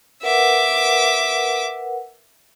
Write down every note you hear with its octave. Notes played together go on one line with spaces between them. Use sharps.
A#4 B4 E5 F#5 D6